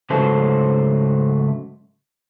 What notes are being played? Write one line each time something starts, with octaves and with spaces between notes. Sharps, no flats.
G#2 C#3 F#3 A3 C5 A5